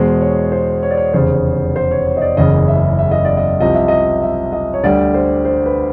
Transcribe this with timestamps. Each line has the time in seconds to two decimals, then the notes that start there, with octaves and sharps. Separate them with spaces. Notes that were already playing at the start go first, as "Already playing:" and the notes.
Already playing: E2 B2 G#3 C5
0.21 C#5
0.52 C5
0.83 C#5
0.91 D5
0.97 C#5
1.14 F1 E2 C#3 C5
1.76 C5
1.91 C#5
2.06 C#5
2.17 D#5
2.22 D5
2.37 F#1 E2 C#3 D#5
2.68 E5
2.99 E5
3.11 D#5
3.25 D5
3.37 D#5
3.60 C2 C3 F3 D#5
3.74 E5
3.88 D#5
4.22 E5
4.53 D#5
4.74 C#5
4.84 D2 D3 G3 D5
5.14 C5
5.45 C5
5.66 B4